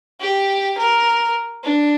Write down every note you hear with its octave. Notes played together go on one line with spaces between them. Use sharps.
G4
A#4
D4